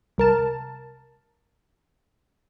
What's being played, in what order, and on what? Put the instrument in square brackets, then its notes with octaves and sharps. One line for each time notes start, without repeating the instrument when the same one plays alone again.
[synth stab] C2 A#4 A5